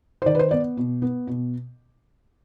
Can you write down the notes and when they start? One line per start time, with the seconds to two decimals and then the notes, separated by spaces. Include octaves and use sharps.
0.22 C5
0.26 D#3 D5
0.35 B4
0.39 C5
0.51 B3 D5
0.77 B2
1.02 B3
1.27 B2